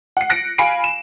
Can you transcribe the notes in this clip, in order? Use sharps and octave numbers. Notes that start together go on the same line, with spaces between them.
F#5 C7
F#6 A#6 C#7 D7
F5 G#5 B5 C7 D7
E7